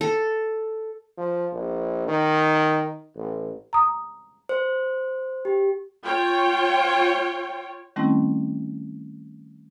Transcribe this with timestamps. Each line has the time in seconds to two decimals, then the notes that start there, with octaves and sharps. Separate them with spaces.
0.01 A4
1.18 F3
1.53 A#1
2.08 D#3
3.16 A1
3.73 A#5 D#6
4.49 C5
5.45 G4
6.05 F4 C#5 G5
7.96 D#3 G3 A3 C4 C#4 E4